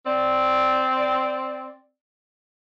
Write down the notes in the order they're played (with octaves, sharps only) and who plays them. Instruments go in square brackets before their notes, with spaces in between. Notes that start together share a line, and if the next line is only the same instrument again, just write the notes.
[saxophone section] C4 D5